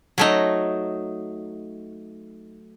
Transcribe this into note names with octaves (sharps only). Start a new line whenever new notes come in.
F#3 A3 D#4